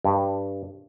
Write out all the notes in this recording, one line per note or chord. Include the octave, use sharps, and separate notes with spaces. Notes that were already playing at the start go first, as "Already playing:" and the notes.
G2